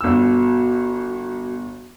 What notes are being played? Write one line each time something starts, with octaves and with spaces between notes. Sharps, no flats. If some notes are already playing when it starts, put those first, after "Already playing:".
G1 F#4 E6